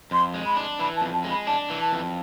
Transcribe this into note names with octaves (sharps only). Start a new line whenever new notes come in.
F2 C6
G#3
B5
D4
E3 B5
A5
F2
A5
G#3
B5
D4 A5
E3
A5
F2